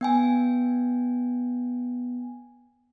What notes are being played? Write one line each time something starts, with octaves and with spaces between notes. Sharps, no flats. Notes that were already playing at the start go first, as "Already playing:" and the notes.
B3 G5 G#5